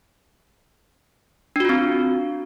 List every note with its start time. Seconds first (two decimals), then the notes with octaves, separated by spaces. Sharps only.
1.56 D4
1.60 F#4
1.65 F4
1.69 C4